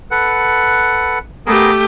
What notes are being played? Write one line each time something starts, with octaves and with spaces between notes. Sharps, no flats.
A4 B4 F#5
A3 B3 G4 G#4 A#4